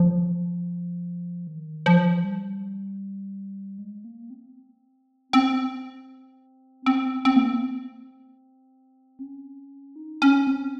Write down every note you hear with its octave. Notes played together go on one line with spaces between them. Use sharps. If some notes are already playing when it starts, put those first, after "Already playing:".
Already playing: F3
D#3
F3
G3
G#3
A#3
C4
C4
C4
C4
A#3
C4
C#4
D#4
C#4
C4